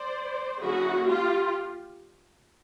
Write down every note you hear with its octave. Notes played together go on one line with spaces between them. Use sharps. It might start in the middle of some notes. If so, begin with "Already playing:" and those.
Already playing: C5 D5
D3 F#3 A#3 C#4 E4 F#4 G#4
F4 G4